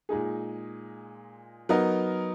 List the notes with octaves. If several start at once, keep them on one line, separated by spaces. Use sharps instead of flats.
A#2 G#3 D#4 G#4
F#3 B3 D#4 A#4 D#5